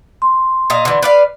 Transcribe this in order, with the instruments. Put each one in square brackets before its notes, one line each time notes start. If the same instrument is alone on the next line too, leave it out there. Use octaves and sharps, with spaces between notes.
[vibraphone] C6
[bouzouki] A#2 D#5 F5
D3 E3
B4 D5 F5